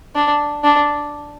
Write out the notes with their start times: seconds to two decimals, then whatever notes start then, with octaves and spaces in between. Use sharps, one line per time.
0.15 D4
0.63 D4